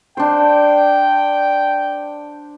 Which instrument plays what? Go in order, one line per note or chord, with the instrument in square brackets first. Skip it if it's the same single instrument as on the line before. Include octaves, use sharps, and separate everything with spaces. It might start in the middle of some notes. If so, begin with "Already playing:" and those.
[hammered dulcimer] D4 C5 [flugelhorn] G5